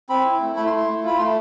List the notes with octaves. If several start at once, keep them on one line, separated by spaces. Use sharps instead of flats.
C4 B5
E4
A3
A3 B5
C6
E4
C6
A3
F4 B5
A3 C6